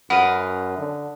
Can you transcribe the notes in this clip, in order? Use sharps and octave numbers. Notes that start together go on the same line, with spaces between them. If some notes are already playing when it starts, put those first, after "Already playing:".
F#2 B4 D#5 F5 F#5
D3